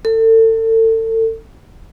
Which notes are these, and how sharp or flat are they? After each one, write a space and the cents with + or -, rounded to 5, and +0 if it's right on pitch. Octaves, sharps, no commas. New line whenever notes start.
A4 +35